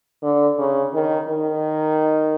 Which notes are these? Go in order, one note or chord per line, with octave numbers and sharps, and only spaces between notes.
D3
C#3
D#3
D#3